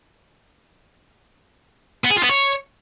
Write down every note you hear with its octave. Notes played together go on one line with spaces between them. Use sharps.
B3
G#4
F4
B3
C#5